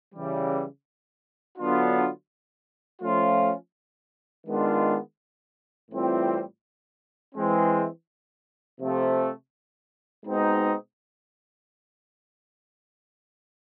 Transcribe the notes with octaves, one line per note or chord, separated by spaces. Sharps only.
C#3 E3 G3
D3 F#3 B3 D4 F4
F3 A3 C#4 F4
D#3 G#3 B3 D4 F4
A2 E3 G3 C4 F4
E3 G#3 C4
C3 F3 A3
B2 G#3 C4 D#4